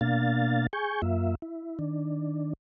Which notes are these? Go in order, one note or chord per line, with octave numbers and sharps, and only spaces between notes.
B2 A#3 D4 F5 A6
G#4 G#5 C#6 G6
F#2 A#3 F4 E5
E4
D#3 D4